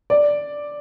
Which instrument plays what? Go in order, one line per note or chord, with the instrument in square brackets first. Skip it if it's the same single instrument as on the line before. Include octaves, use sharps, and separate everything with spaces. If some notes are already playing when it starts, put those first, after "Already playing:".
[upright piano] D5